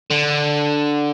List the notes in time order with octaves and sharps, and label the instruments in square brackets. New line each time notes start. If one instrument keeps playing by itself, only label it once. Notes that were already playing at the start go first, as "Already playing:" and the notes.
[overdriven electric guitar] D3